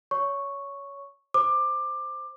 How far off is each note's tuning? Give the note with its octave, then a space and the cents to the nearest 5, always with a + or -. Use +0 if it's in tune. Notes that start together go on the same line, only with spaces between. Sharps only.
C#5 +20 C#6 +0
C5 +5 D6 +20